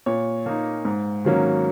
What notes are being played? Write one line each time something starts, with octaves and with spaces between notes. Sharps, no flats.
A#2 C#5
A#3 D#4
G#2
D#3 F#3 A#3 C#4